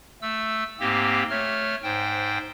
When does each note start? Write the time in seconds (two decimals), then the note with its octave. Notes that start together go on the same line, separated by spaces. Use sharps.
0.22 A3 E6
0.80 G#2 A#3 C4 G4
1.30 A3 C#5 F6
1.83 G#2 C5 G5